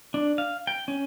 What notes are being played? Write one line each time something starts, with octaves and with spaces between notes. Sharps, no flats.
D4
F5
G5
C#4